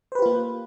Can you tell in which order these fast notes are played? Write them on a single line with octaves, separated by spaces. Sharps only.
C5 B4 G4 F4 A#3